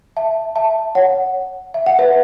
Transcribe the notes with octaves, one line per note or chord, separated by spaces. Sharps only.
E5 A5
E5 A5
C#5 F#5
E5
F#5
B4 E5